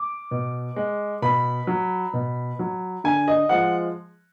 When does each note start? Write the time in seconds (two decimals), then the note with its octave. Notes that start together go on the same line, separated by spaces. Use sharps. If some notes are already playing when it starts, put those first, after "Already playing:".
Already playing: D6
0.31 B2
0.76 G#3
1.22 B2 B5
1.67 F#3
2.14 B2
2.59 F#3
3.04 D3 G#5
3.28 D#5
3.49 F3 G#3 F#5